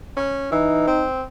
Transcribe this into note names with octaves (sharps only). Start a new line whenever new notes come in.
C#4
E3 D#4
C4